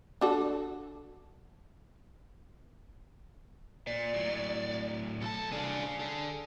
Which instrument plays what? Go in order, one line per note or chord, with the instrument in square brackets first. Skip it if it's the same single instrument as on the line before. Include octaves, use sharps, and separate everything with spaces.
[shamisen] D4 F#4 A4
[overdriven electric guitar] A#2 [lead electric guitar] D5
[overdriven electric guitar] A2 F#3
[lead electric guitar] B1 A5 [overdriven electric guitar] A4
[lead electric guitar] C2 D4 [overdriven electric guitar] G#4 F5
[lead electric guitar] D4 A4